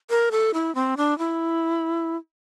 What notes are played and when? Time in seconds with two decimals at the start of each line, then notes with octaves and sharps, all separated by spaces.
0.10 A#4
0.32 A4
0.54 E4
0.75 C4
0.97 D4
1.18 E4